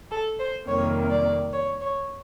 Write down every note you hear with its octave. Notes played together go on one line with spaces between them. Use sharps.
A4
C5
F2 C3 D#3 G3 A#3 C#5
D5
C#5
C#5